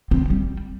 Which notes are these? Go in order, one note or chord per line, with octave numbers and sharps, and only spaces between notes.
C4
G3